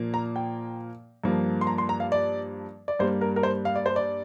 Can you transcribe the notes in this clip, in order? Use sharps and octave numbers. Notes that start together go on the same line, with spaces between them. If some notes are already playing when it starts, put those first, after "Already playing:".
Already playing: A#2 F3 A#3
A#5
G5
G2 F3 A#3
C6
A#5
C6
A#5
F5
D5
D5
G2 G3 A#3 C5
A#4
A#4
C5
F5
D5
C5
D5